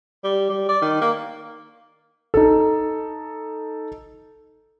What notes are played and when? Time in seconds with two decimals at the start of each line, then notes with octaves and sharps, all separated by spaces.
0.24 G3
0.49 G3
0.69 D5
0.82 D#3
1.01 A#3
2.34 D#4 A4